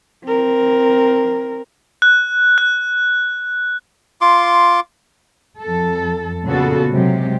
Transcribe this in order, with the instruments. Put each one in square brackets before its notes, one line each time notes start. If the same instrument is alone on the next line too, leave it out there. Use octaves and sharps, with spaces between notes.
[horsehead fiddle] C4 A#4
[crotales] F#6
F#6
[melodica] F4 C6 D6
[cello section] F2 A4
A#2 C#3 B3 F#4 A4
C3 F#3 G#3 G4